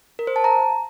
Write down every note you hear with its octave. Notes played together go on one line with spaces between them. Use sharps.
A#4
C5
A5
A#5